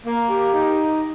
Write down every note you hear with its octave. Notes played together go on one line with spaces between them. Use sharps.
A#3
G4
D#4